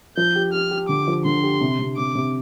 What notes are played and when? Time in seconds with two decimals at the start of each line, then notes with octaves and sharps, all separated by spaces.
0.17 F3 G6
0.35 G4
0.53 G4 F6
0.71 G4
0.89 D3 D6
1.08 F3
1.25 D3 C6
1.43 G4
1.61 C3
1.79 C3
1.97 C3 D6
2.15 C3